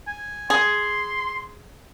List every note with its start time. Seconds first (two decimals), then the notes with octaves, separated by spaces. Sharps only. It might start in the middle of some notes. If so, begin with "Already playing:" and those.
0.07 G#5
0.50 G#4 C6